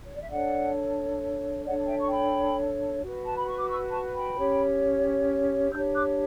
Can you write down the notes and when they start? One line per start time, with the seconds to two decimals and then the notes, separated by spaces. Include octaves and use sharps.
0.05 C#5
0.12 D5
0.20 E5
0.29 D4 A4 C#5 D5 F#5
1.65 D4 A4 C#5 D5 F#5
1.87 E5 G5
1.99 C#6
2.10 G5 B5
3.01 F#4 B4
3.24 A5
3.36 B5
3.46 C#6
3.57 D6
3.68 C#6 E6
3.90 A5 C#6
4.14 G5 B5
4.36 C#4 G4 C#5
5.71 D4 G4 C#5 E6 G6
5.94 D6 F#6